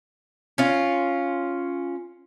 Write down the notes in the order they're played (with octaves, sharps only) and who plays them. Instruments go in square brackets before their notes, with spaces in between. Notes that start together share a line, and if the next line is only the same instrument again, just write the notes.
[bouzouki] C#4 F4